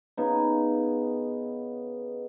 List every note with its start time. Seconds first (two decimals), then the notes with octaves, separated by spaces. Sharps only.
0.17 C#3 B3 D#4